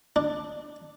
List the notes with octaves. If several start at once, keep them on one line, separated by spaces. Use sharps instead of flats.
D4